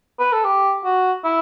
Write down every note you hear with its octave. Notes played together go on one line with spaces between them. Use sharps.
B4
A4
G4
F#4
E4